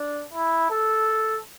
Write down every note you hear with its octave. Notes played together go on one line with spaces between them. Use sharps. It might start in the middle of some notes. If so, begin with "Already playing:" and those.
Already playing: D4
E4
A4